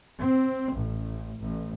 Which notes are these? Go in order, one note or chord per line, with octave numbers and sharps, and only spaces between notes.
C4
A1
A1